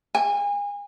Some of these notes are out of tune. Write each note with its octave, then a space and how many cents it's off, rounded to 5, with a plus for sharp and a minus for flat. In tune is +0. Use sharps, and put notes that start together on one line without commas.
G#5 -35